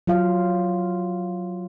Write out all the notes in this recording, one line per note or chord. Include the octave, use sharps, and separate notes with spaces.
F#3 F4 F5